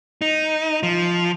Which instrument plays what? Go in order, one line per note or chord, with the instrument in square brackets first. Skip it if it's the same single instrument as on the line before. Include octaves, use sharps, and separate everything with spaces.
[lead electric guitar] D#4
F3